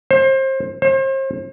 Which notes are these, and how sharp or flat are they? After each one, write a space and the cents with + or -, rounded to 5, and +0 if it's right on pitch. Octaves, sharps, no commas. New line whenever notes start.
C5 +30
C5 +40